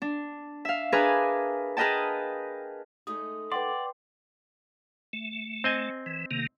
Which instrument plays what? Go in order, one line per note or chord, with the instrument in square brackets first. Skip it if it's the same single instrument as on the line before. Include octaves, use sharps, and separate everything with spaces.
[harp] D4
E5 F5
D4 G#4 A#4 B4 G#5 D6
G#4 A#4 B4 D#5 G5 A5
[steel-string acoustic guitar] G#3 A3 D#4 [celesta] D#6
[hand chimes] B4 G5 C6 [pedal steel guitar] D5 [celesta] F#5
[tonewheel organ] A3
[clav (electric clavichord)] C4 D#5 G#5
[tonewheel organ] E3
C3 D#3 A#3